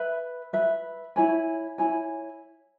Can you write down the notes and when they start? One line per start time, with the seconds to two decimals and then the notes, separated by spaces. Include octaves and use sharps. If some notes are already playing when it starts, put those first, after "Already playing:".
Already playing: B4 E5 B5
0.53 B4 E5 B5
1.16 E4 C#5 G#5 B5
1.78 E4 C#5 G#5 B5